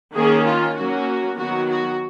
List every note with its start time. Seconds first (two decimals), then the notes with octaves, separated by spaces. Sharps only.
0.15 D#3 A#3 C#4 G#4
0.46 F4
0.76 F#3 A#3 C#4 F#4
1.38 D#3 F#3 B3 F#4
1.69 F#4